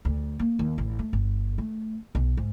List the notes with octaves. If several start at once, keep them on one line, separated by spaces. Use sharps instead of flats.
D2
A#3
D#2
A1
A3
G1
A3
B1
G#2